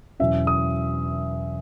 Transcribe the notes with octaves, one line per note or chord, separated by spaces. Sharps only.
E2 B2 F#3 C#4 E4 E5
D#6